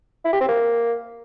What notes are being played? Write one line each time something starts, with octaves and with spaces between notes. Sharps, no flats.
E4
G4
C4
A#3